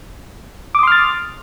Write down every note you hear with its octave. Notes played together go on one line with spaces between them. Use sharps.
C6 D6 D#6 F6 A6